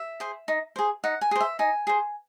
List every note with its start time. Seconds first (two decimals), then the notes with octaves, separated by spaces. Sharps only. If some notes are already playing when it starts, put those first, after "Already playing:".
Already playing: E5
0.20 G#4 C5
0.48 D#4
0.76 G#4 C5
1.04 D#4 F#5
1.21 G#5
1.31 G#4 C5
1.41 E5
1.59 D#4 G#5
1.87 G#4 C5